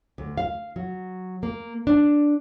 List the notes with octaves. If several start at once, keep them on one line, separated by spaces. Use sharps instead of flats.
D2
F5
F#3
A#3
D4